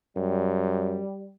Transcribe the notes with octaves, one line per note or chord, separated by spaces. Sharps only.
F#2 G3